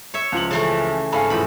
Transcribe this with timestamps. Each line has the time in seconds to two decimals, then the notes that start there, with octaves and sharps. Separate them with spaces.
0.14 C#5 E5
0.32 C#2 F3 F#7
0.51 C#3 E3 A3
1.12 G#2 A3 F5 G#5 B5
1.30 E2 A2 F3 B5